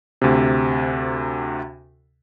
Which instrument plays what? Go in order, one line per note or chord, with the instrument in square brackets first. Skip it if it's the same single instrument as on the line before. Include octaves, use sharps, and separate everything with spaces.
[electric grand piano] D2 C3